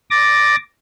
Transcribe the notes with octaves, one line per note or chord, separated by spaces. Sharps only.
D6 A6 A#6